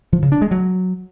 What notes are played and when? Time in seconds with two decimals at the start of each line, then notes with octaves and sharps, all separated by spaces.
0.13 F3
0.22 C#3
0.32 D4
0.42 G#3
0.51 F#3